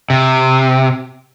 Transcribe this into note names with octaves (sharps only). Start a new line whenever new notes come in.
C3